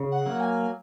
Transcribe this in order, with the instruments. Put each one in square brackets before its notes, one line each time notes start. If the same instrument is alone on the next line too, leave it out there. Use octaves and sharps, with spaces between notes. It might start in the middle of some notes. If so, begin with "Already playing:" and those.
Already playing: [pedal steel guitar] C#3
[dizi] F#5
[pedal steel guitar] F#3 A#3
[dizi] G#5